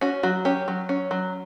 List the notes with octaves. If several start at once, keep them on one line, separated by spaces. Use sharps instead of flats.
C#4 F#4
F#3 F#4
C#4 G4
F#3
C#4
F#3